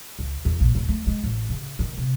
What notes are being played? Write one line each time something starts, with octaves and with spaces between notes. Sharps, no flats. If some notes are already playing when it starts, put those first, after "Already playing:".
C#2
E2
A#1
D1
A3
G#3
A1
C#3
D#3
C3